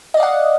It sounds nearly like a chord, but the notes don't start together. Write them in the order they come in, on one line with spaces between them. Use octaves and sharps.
D#5 D5 F5 F#5